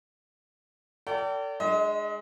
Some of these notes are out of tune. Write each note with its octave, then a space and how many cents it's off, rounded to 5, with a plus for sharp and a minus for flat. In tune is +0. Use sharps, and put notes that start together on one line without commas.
A4 +40 D5 -35 G5 -30
G#3 +0 D4 +15 D#5 +35